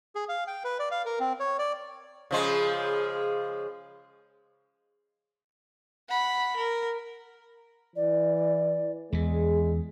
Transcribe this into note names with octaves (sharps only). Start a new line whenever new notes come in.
G#4
F5
G5
B4
D5
F5
A#4
C4
C#5
D5
C#3 F3 G#3
F#5 B5
A#4
E3 D5
E2 E3 G#3 G#4